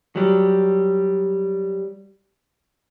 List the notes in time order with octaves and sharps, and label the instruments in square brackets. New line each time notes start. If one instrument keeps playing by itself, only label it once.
[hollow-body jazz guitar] F#3 G3